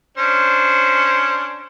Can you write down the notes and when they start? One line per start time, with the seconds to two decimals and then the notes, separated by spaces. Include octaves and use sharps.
0.18 C#4 D4 C5